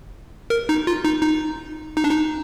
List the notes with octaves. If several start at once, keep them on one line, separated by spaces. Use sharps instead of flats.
A#4
D#4
F4
D#4
D#4
D#4
D4
D#4